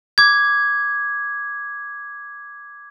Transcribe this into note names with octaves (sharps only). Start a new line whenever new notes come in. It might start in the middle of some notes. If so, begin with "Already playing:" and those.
D6 G#6